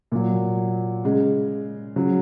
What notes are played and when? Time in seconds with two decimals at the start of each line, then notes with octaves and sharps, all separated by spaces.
0.12 A#2 F#3
1.04 C#3 G#3
1.96 C#3 F#3